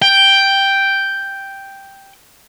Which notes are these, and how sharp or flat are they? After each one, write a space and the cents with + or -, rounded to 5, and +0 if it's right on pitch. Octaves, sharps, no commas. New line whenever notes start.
G5 +0